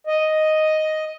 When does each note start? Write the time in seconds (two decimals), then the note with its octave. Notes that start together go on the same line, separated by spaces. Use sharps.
0.07 D#5